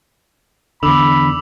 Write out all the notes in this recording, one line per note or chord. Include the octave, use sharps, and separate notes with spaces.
E2 D3 B5 D6 E6 F7